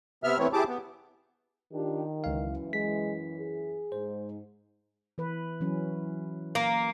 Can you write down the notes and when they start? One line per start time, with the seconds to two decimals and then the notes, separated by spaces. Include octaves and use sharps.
0.24 C3 B3 E5 F6
0.39 E3 A3 B3 C4 C#5
0.53 E4 G4 G#4 A5 D6
0.68 B3
1.73 D#3 D4 F4 G4
2.24 C#2 F#2 E3 F5
2.73 G#3 B6
3.40 G#4
3.92 G#2 C5
5.18 E3 B4
5.61 E3 F#3 C#4
6.55 A#3